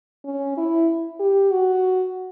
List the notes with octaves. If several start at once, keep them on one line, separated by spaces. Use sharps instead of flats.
C#4
E4
G4
F#4